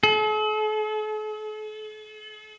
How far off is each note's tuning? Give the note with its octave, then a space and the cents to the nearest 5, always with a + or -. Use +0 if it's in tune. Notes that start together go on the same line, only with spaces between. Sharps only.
A4 -45